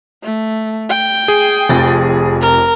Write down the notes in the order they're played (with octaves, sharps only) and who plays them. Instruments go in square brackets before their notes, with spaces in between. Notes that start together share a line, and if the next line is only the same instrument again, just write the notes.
[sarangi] A3
G5
[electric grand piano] G#4
[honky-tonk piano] F1 F2 A6
[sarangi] A#4